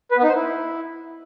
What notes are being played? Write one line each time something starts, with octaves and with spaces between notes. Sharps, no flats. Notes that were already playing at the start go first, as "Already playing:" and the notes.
B4
B3
D#4
C5
E4